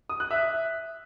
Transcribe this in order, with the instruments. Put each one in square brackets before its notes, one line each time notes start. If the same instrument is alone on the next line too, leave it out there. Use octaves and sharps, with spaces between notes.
[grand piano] D#6
F#6
E5